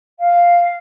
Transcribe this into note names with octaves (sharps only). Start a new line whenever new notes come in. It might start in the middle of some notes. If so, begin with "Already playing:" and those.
F5